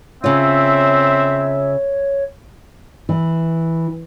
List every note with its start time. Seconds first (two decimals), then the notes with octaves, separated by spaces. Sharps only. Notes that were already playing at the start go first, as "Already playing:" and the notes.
0.24 C#3 C4 F4 C#5 E5
3.09 E3